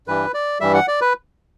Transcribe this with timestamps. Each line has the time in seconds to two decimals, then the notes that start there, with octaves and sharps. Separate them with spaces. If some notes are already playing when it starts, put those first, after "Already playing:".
0.07 G2 E3 G3 B4
0.34 D5
0.60 G2 E3 G3 E5
0.74 F#5
0.88 D5
1.01 B4